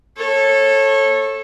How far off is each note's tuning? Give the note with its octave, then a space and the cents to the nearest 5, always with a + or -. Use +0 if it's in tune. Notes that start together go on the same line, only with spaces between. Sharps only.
A4 +0 C#5 -25